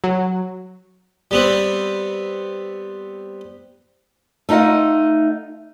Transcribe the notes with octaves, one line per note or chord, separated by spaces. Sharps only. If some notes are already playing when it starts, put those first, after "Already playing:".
F#3
G3 B3 C4
A3 D#4 F4 D#5 F#5